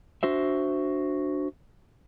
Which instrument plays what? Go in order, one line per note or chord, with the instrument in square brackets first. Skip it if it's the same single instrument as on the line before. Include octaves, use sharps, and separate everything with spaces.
[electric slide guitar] D4 F#4 C5 E5